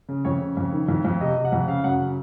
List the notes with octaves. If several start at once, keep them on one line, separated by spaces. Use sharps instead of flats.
C#3
F2 C#5
C#3
F2
D#3
F2
F2
C3 D#5
C3
F#5
F2
C#3 F5
F#2 F#5
C#3